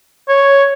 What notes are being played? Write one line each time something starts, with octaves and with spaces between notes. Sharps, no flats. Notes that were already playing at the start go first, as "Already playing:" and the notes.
C#5